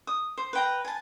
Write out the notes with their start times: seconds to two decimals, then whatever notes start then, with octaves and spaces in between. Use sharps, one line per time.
0.07 D#6
0.37 C5
0.53 B4 G5 A#5
0.85 G#5 A5